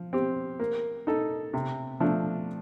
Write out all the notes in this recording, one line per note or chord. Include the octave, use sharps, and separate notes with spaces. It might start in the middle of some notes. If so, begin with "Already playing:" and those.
Already playing: F3
C4 G4
A#3
D#4 A4
C3
F3 A3 D4